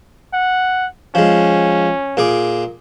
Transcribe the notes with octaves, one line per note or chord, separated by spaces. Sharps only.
F#5
F3 G#3 C#4
A#2 G#4 D6